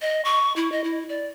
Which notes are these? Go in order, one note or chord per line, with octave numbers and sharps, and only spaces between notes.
D#5
C#6
E4
D#5
E4
D5